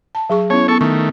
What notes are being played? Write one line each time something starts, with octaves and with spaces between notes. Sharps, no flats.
A5
F#3 G#4 C#6
B3 C#4 E4 C#5
B3 A4 C#6
D#3 A3 C#6